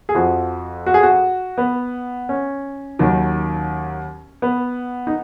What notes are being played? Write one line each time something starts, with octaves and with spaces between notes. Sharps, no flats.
G#4
F2 F3 F#4
F#4
G#4
F#4
B3
C#4
D#2 D#3 F#3
B3
D#4